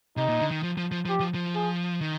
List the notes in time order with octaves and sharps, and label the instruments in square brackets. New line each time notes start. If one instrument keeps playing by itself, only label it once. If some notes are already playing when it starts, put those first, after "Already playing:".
[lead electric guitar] C3 [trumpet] D#4
[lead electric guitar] A#2
D3
D#3
F3
F3
F3
F3
[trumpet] G4
[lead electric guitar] F3
F3
[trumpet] G#4
[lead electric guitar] D#3